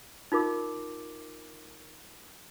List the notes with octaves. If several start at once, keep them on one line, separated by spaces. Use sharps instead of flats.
D#4 F4 A#4 D6